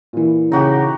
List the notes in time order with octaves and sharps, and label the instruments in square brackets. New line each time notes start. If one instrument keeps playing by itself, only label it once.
[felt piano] A#2 E3
[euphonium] C#3 [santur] D#4 F#4 G4